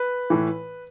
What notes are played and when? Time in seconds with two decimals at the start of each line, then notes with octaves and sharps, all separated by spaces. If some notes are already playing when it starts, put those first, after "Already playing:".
Already playing: B4
0.30 A2 E3